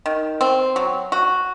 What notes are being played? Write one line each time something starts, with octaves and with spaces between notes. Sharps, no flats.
D#3
C4
F#3
F#4